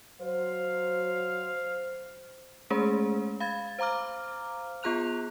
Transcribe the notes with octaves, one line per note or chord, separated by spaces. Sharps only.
F#3 C5 F5
G#3 A3 C#4 G#4 C5
F5 B5 G#6 A6
C5 F5 A#5 D6 F6
B3 F4 G#4 A#5 F#6 F7